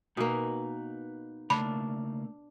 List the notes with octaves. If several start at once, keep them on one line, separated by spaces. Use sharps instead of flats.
B2 A#3 D#4 B4 G#5
C#3 A3 A#3 D4 B5